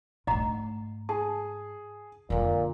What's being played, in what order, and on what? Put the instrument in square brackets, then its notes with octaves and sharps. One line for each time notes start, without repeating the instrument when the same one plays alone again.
[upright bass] G#2 A3 [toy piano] D#5 F#5 A#5
[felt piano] G#4 [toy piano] A5
[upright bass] F2 D3 [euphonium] A#2